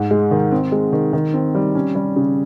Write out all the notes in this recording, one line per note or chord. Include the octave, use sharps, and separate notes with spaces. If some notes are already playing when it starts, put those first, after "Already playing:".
Already playing: G#2
G#3
D#3
C4
G#3
D#3
D#3
C4
G3
C#4
G3
C#3